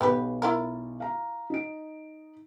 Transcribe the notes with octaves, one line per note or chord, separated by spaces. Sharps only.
B1 B3 G4 B4
E4 F4 A#4
F5 A#5
D#4 D7